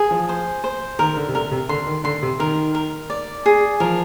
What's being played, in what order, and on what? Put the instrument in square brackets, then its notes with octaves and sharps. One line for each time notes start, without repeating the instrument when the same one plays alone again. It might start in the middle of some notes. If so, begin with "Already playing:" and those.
Already playing: [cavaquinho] G#4
[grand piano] F3
[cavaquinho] C5
C5
[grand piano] D#3 [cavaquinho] A#4
[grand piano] D3
C3
[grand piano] D3 [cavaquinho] A#4
[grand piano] C3
[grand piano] D3 [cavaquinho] C6
[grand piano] D#3
[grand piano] D3 [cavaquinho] C6
[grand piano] C3
[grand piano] D#3 [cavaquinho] A#4
[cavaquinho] A#4
D5
G#4
[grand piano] F3 [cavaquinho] A#4